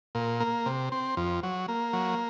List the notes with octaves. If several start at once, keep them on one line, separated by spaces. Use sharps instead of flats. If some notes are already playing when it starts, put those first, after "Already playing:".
A#2
A#3
C3
C4
F2
F#3
A#3
F#3